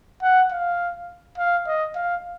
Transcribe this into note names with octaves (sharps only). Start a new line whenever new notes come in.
F#5
F5
F5
D#5
F5